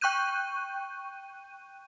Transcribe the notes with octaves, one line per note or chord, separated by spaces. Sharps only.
G5 C#6 F#6 G6 D#7